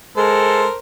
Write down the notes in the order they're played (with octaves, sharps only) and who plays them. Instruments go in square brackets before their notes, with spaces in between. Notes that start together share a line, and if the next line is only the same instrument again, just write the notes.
[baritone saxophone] G#3 [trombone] A4 [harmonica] A#4 C5